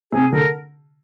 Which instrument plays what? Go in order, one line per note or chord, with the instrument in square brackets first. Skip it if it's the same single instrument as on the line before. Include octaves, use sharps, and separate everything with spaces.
[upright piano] C3 [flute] G#4
[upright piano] D3 [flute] A#4